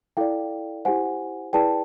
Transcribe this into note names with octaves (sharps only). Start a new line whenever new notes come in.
E4 A4 D5 F5 G5
E4 G4 C5 F#5 G#5
E4 G#4 B4 D5 G5 A5